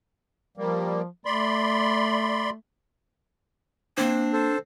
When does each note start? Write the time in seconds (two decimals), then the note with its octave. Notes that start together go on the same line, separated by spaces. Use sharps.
0.57 F3 G3 A#3
1.25 A3 D5 B5 C6
3.98 A#3 C4 D4
4.33 A4 C5